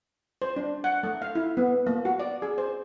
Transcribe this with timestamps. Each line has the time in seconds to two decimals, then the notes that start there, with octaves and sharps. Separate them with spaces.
0.42 C5
0.56 D4
0.84 F#5
1.03 A3
1.22 F5
1.35 E4
1.57 B3
1.87 A#3
2.05 F#4
2.19 D5
2.42 G#4
2.58 C5